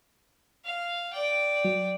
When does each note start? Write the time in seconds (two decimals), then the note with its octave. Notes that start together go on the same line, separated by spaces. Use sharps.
0.64 F5
1.13 D5 G5
1.65 F#3